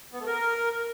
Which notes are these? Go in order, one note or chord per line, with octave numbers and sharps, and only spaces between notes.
B3
A3
A#4